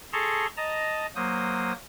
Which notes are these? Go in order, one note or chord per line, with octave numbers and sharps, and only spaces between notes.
G#4 A4 A5 A#5 C6 C#6
D#5 A5 A#5
F#3 A#3 C5 D#6